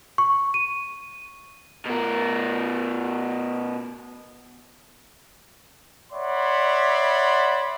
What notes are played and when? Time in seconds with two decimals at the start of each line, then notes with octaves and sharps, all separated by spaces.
0.18 C#6
0.54 D#7
1.85 B2 A#4
6.12 C#5 D5 E5 F#5 B5 C6